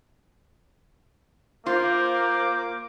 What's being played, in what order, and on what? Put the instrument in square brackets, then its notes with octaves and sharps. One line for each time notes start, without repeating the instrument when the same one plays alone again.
[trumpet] A#3 [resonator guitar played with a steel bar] F4 [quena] C5 [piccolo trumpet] D6